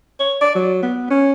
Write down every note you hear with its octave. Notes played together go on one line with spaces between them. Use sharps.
C#5
D5
F#3
B3
C#4